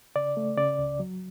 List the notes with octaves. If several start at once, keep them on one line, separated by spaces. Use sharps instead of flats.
C#3 D5
A3
C#3 D5
C#2
F#3